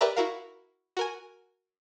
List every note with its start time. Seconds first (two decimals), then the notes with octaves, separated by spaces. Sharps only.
0.01 G4 A#4 B4 D5 E5 A#5
0.16 E4 F#4 A#4 F5
0.97 F#4 A#4 G#5